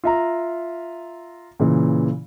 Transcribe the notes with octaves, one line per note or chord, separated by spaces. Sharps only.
F4 E5 A#5
A#2 C#3 E3